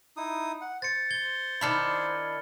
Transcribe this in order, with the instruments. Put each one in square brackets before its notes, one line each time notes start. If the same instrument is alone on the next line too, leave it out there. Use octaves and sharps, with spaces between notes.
[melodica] D#4 E4 D#6
F#5
[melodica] C5 [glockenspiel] A6 C#7
[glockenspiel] G#6 G7
[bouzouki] D#3 D4 E4 [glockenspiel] B5 F6 C#7